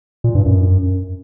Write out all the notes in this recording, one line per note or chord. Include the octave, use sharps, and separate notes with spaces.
A#2
G2
F#2